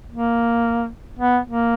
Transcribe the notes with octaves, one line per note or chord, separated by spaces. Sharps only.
A#3
B3
A#3